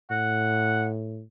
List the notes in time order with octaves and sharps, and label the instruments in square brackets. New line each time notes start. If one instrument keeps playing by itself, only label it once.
[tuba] A2 [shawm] F#5